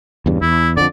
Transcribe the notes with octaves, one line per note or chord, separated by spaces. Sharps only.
E2 G2 C#3
E2 E4
F2 D3 D5